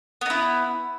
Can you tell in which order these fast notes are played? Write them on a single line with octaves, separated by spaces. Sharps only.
B3 D#4 E4